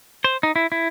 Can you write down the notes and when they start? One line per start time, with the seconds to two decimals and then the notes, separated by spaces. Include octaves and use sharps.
0.24 C5
0.43 D#4
0.56 E4
0.72 E4